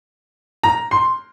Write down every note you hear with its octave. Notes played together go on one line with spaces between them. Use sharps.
A#5
C6